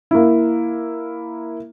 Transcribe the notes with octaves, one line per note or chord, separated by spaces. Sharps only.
A#3 E4